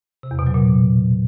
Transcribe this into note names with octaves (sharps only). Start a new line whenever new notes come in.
C3
E2
B2
F#3
A#2